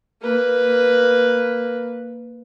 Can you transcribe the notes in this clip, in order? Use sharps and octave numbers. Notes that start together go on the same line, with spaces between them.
A#3 B4